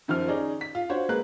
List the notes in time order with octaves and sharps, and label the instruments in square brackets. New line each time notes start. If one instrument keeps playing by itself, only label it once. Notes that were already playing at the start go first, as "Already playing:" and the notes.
[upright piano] F#2 D#3 F3 F6
C#4 D#4 G#4 D5
B6
F4
D4 F#4 C5 C#5
G#3 A#3 B4 F#6